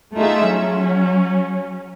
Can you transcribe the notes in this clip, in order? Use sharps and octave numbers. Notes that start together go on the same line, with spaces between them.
A3 D#4 F4 G#4 E5
F#3 C#4